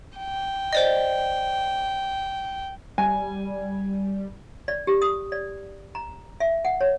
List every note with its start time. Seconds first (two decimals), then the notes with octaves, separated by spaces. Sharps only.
0.18 G5
0.73 C5 D5 D#5
2.98 G3 G#5
4.68 D5
4.87 G4
5.02 D#6
5.32 D5
5.95 A#5
6.40 E5
6.65 F#5
6.81 C#5